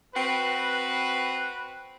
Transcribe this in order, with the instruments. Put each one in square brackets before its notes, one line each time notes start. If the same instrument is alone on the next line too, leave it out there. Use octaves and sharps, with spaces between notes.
[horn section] C4 F#4 B4